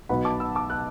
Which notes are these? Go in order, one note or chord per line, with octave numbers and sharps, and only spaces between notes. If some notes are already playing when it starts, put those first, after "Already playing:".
B1 B2 B3 F#5 B5
A5 D6
B5 E6
A5 D6
F#6